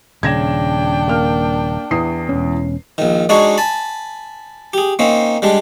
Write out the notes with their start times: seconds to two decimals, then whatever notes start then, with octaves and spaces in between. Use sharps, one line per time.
0.23 D#1 C#3 D4 G5 G#6 A#6 E7
1.08 A#3 F6
1.91 E2 D#6 C7
2.29 E1 C#4
2.98 A#1 D#3
3.29 G#3 D4 D#4 F#4 G#4 C#5
3.58 G#5 A5 B5
4.73 G4 G#4
4.99 A#3 C4 C#4 D#4
5.42 G3 G#3 D4